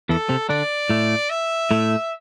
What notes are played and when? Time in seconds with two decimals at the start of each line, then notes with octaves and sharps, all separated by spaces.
0.09 E2 E3 A4
0.29 C3 C4
0.49 D3 D4 D5
0.90 A2 A3
1.30 E5
1.71 A2 A3